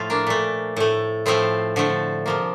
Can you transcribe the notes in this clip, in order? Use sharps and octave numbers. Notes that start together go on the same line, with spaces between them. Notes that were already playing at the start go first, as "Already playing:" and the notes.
Already playing: A2 F3 A3 F4
A#3 D4
A#2 A3
A2 A3
A2 F3 A3 C4
D3 F3 A3
C3 F3 A#3